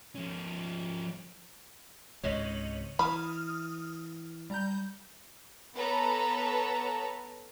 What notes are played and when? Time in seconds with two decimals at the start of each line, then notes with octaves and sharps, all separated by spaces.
0.15 F3 C#4
2.24 C#2 G#2 C3 C#5 D#5 F#7
2.99 E3 B5 D#6 F6
4.50 G3 A#5 G6
5.75 B3 A4 B4 C#5 A5 A#5